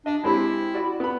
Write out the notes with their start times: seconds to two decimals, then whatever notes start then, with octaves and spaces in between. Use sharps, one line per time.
0.06 D4 D#5
0.24 G#3 C4 E4 G4
0.74 F#4 D5
1.00 B3 B5